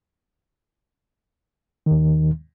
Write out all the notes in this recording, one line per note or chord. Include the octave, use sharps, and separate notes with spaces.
D#2 D#3